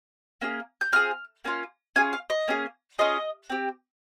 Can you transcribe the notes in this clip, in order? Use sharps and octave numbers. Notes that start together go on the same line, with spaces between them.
A#3 C#4 G#4
G6
C4 F4 G#4 F6
A#3 C#4 F4
C#4 F4 G#4 G#5
F5
D#5
A#3 C#4 G#4
C#4 F4 G#4 D#5
C4 G4